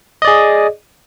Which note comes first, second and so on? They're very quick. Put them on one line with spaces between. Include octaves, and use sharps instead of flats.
D#5 D5 G#4